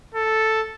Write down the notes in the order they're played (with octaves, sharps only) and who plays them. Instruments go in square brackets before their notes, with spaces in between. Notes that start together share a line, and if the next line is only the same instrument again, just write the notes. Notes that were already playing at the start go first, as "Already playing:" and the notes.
[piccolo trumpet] A4